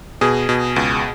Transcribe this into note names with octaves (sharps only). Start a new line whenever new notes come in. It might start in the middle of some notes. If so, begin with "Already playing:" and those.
B2 G#4
B2
C#2